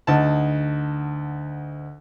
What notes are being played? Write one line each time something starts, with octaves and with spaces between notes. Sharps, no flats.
D2 D#4 F#5 A5